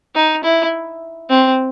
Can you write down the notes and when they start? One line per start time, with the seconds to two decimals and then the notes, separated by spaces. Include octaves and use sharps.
0.15 D#4
0.44 E4
1.30 C4